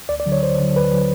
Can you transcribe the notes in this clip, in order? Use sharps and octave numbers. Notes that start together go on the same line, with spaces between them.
D2 D5
D5
D3 F#3
C#5
D2 C5
D3 F#3
D2 B4
D3 F#3